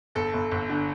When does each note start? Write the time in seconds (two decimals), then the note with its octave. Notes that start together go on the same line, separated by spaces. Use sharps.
0.15 G1 A4
0.33 G1
0.51 G1
0.70 D3